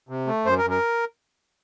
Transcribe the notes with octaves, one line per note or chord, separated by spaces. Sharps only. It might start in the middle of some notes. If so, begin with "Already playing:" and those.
C3
A3
F#2 C5
A#4
F#2
A#4